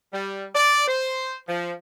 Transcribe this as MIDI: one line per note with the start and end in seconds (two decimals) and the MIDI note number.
0.13 0.46 55
0.55 0.87 74
0.88 1.39 72
1.48 1.72 53